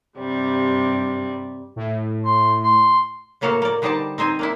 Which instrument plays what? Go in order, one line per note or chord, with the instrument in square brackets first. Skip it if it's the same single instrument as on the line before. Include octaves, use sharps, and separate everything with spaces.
[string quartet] G2 C3 G3
[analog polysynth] A2
[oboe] C6
C6
[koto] A2 C#3 A#3 F#4 A4 F5
A#3 D5
D3 G3 D#4 C5 D5 A5
C4 D#4 C5 G#5
A#3 D4 E4